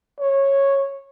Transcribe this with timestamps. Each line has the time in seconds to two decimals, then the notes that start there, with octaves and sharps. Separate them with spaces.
0.19 C#5